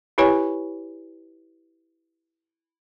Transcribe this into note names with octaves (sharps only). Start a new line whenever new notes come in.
E4 G4 B4 C#5 G#5